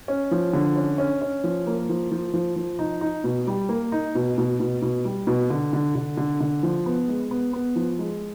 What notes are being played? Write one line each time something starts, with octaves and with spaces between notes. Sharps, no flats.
C#4
F3
D3
C#4
C#4
C#4
F3
A#3
F3
F3
F3
F3
D#4
D#4
B2
G3
A#3
D#4
B2
B2
B2
B2
G3
B2
D3
D3
D3
D3
D3
F3
B3
G#3
B3
B3
F3
G#3